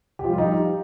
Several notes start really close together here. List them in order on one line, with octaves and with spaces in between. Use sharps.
G4 F3 G3 F4 D#4